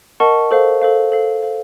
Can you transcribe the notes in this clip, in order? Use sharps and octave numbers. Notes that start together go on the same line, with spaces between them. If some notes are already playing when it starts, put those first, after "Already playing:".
A#4 D#5 F#5 A5 C#6
A4 C5 F5
A4 C5 F5
A4 C5 F5
A4 C5 F5